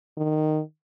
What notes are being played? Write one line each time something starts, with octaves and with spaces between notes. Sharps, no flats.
D#3